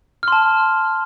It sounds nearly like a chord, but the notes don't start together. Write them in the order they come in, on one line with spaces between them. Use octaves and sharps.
F6 C6 A5